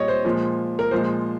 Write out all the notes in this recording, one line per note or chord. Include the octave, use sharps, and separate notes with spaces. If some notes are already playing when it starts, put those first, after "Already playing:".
Already playing: A#2 G3 C#5 D#5
C5
A#2 F3 G#3
A#4
A#2 F3 G#3 C5